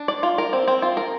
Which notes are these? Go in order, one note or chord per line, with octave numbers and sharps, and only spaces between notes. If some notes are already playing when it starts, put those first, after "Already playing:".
Already playing: D4
D5
F4
A#4
C4
C4
F4
A#4